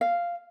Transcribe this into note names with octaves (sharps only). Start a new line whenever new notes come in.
F5